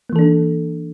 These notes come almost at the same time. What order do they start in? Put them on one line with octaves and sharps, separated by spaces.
A#3 E3 A4 D4